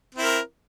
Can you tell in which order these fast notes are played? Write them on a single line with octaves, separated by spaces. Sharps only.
C4 E4 A#4